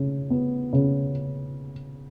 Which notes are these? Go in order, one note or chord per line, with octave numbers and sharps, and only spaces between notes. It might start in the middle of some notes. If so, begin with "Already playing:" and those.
Already playing: C#3
B3
C#3